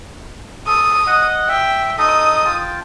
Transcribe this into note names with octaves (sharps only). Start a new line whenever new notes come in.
A4 D#6
D#5 F#5
E5 G5
D#4 A4 D#5 D#6
F4 G5 A5